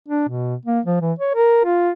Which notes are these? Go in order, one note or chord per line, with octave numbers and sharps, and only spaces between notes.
D4
B2
A#3
F3
E3
C#5
A#4
F4